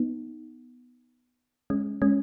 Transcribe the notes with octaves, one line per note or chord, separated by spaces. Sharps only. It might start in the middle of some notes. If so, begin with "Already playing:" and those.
Already playing: B3 D#4
G#3 C#4
G#3 C#4